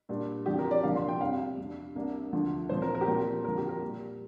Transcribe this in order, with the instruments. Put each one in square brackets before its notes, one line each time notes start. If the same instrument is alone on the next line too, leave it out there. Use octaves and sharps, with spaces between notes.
[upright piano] A#2 G3 D4
F2 F3 D4 G4
A#4
D5
C2 A#2 F3 A#3 D4 F5
C6
G5
F2 C3 G3 C4 F5
F2 C3 G3 D4
C2 C3 G3 A#3 D4
D2 D3 F3
A#2 F3 C4 C5
A#4
A#4
G4
A#2 F3 C4 A#4
F2 D3 F3 A#4
G4
A#4
A#2 G3 A#3